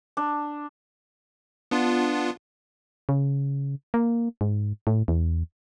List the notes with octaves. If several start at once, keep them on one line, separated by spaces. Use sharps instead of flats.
D4
B3 D4 F4
C#3
A#3
G#2
A2
E2